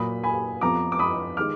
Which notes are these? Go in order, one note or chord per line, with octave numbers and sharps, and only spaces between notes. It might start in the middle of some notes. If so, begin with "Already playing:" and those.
Already playing: A#2 F#3 A#3 B5 D#6
G#5 B5
F2 F3 B3 A#5 D6
D6
B5 D#6
D#3 G#3 D6 F6